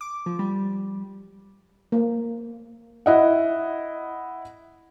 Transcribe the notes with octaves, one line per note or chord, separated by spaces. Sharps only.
D6
F3
G3
A#3
E4 D#5 F#5